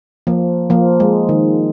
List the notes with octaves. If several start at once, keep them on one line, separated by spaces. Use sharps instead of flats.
F3 A#3
F3 A#3
G#3
D#3